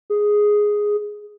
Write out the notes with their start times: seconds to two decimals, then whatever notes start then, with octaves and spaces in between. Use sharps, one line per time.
0.10 G#4